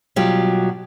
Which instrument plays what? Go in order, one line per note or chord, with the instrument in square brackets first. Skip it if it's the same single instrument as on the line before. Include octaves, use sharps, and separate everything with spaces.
[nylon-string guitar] B2 F#3 G3 F4 G4